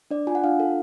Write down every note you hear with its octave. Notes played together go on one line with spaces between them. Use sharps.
D4 D5
F4 G#5
F#5
D4 F4 F5
A4